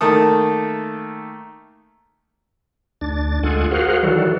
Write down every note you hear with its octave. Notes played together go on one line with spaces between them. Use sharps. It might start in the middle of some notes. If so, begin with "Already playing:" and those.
D#3 A3 A#3 A4 D#6
D2 D4 A6
D2 G#3 F4 A4 F#5 G#5
F#4 G#4 A#4 C5 F5 F#5
D#3 E3 F#3 G3 F#4 A4